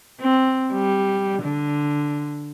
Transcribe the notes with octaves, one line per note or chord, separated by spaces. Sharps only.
C4
G3
D3